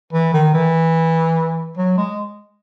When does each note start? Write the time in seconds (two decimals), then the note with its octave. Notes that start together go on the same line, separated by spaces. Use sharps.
0.13 E3
0.34 D#3
0.54 E3
1.77 F#3
1.98 G#3